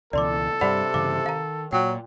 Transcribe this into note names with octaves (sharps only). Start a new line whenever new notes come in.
C#2 B2 E3 A4 D5 C6 D6
G2 C3 G3 D5 F#5 B5
G2 C#3 E3 F5 D6
D#3 F5 A#5
A#2 F#3 G5